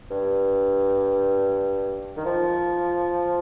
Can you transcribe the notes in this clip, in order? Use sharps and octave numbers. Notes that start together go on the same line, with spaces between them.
G2
D#3
F3